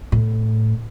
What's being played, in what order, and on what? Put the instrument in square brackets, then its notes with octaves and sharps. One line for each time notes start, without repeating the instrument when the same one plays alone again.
[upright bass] A2